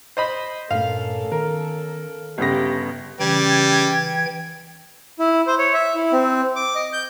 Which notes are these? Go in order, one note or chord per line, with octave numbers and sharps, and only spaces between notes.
C5 D#5 B5
G2 A#2 A3 A#3 C#4 A4 F5
D#3 B3 A#4
G1 C#3 G4 F#5 D#6 A#6
C#3 E3 G3 G5 G#6
E4
C5
C#5
E5
E4
C4
D6
D#5
G6